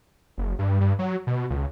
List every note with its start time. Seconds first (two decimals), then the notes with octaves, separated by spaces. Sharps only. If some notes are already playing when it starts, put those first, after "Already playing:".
0.38 F#1
0.59 G2
0.80 G2
0.99 F#3
1.27 B2
1.50 C#2